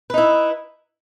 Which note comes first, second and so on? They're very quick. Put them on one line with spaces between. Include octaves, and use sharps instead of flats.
B4 D#4 E4